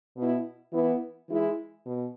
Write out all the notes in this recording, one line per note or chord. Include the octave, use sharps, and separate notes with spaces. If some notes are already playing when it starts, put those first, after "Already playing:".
B2 B3 E4
E3 B3 E4
E3 G#3 E4
B2